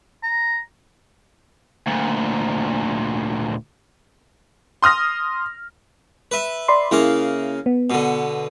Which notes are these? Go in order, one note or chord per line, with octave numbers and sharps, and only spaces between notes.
A#5
D2 A#2
C6 D#6 F6 A#6
B4 E5
D5 B5 C6
C#3 A#3 E4 F5
B3
B2 D3